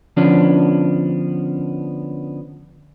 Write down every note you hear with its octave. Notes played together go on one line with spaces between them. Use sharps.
D3 F3 B3 C#4 D4